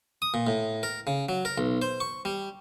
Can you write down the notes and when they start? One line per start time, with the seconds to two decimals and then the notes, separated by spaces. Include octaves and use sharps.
0.22 D#6
0.34 A#2
0.47 A2
0.83 A#4
1.07 C#3
1.29 F#3
1.45 A#4
1.58 B1
1.82 C5
2.00 C#6
2.25 G3